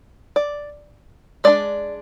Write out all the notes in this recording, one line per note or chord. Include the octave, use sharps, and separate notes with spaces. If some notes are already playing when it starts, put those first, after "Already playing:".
D5
G#3 D4 D5